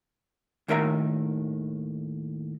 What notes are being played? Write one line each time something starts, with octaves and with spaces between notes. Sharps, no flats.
D#2 A2 D#3 A#4 E5 A#5